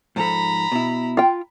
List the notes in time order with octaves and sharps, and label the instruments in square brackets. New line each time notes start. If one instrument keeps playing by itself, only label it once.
[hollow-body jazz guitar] G#2 F3 A4 [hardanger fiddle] A#5 B5
[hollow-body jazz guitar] B2 E4
[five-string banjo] F4 G5